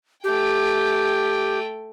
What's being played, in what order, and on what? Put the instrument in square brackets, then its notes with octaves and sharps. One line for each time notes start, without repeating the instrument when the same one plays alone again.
[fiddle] A3 G5 [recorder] G4